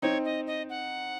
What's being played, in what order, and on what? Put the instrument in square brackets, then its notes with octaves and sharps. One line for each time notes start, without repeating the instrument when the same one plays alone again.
[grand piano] C4 D#4 [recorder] C#5
[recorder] D#5
D#5
F#5